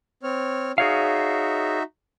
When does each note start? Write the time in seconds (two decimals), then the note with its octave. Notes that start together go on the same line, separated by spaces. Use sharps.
0.23 C4 C#5 F6
0.78 D#4 F#4 G#4 C#5 E5 F5